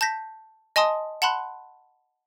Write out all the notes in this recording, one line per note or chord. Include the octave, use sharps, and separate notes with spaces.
A5 G6 A#6 B6
D#5 G#5 A5 C6 D#6
F#5 A5 B5 C6 F#6